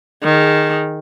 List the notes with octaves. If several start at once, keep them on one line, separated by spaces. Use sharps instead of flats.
D#3 G#4